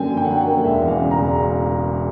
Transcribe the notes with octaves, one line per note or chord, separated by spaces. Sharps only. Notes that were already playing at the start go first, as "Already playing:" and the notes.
Already playing: F#2 D3 F#3 A#3 G5 G#5
D3
G5
F#5
F#3 G5
F#5
A#3
E1 E5
E2
F5
C#3
A#5
E1